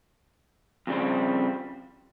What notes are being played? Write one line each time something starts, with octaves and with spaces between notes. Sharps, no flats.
F2 C#3 G3 C4